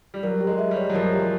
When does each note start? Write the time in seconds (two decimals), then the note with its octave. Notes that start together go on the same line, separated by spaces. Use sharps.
0.14 G3
0.23 F#3 A#4
0.41 G4
0.47 G#3
0.59 E5
0.71 G3
0.77 C#5
0.90 F#3
0.95 F3 A#4
1.13 G4